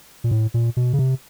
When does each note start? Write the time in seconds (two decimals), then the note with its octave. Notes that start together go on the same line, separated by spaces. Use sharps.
0.24 A#2
0.31 A2
0.54 A#2
0.77 B2
0.93 C#3
0.99 C3